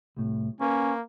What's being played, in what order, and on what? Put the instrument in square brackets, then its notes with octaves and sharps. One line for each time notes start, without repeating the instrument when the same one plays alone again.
[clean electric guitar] C2 A2
[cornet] A#3 [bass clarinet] C#4 [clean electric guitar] B4